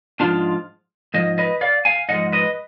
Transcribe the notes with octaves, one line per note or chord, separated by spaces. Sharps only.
G#2 F3 G#3 D4 F4
G#2 F3 D#5
B4 D#5
D5 F5
F5 G#5
G#2 F3 G#3 D#5 F#5
B4 D#5